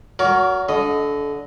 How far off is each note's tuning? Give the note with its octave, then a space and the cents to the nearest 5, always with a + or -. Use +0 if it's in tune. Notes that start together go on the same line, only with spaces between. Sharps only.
F#4 +0 A#4 +0 C#5 +40
D3 -25 D#5 +0